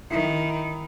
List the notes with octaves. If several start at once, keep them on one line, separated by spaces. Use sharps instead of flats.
D#3 E4 E5